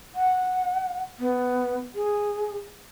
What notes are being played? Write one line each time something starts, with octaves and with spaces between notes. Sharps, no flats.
F#5
B3
G#4